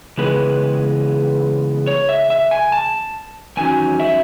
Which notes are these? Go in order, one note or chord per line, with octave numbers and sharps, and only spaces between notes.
C#3 E3 G#3 B3 B4
C#5
E5
E5
G#5
A5
E2 D#3 F#3 C#4 G#5
E5